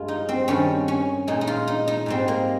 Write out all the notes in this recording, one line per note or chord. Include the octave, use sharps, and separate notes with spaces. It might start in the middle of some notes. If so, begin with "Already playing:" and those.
Already playing: G2 G#3 F4
D#4
C4
G2 D#3 G3 C#4
C#4
A#2 G#3 D#4
D#4
F4
D#4
D#4
G#2 G3 C4
A#3